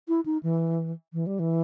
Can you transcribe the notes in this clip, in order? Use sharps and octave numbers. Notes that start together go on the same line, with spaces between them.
E4
D#4
E3
E3
G3
E3